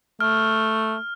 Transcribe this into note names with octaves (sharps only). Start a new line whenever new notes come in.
A3 F6